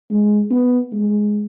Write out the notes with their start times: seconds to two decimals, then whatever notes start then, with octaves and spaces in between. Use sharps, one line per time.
0.10 G#3
0.51 B3
0.92 G#3